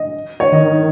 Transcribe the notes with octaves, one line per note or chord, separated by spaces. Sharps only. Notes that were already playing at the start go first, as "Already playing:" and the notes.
Already playing: D#5
C#5
D#3 D#5